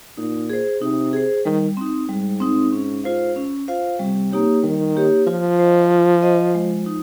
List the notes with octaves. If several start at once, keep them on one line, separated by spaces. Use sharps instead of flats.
A#2 D#4
G#4 C5
C3 D#4
G#4 C5
D#3 G3
C4 D#4
G#2 G3
C4 D#4
C#4
F4 C5 F5
C#4
F4 C5 F5
C3 G3
A#3 D#4 G4 C#5
D#3 G3
A#3 D#4 G4 C#5
F3 F4
C5 D#5
F4
C5 D#5
G#3
D#4